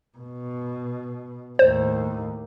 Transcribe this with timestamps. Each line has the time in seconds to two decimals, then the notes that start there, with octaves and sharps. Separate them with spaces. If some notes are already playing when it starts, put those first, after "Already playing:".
0.18 B2
1.59 D#2 A2 C5